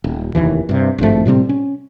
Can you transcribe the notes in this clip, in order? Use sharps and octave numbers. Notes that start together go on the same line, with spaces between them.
D#1
F1 A#1 D#2 E3
G2 C3
G#1 G2 F3 A3
A2 C3 G3 C4
C#4